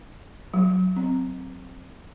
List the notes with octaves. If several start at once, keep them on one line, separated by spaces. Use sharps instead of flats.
F#3
C4